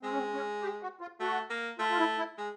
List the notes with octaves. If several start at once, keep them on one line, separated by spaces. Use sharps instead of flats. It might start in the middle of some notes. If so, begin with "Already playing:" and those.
G#3 C4
C#4
C4
C#4
G4
F#4
F4
A3 F#4
A#3
A3 F4
F4
E4
E4
G#3